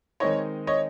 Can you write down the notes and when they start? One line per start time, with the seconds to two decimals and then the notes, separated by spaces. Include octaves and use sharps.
0.20 D#3 G#3 C4 D#4 C#5 D#5
0.67 C#5 D#5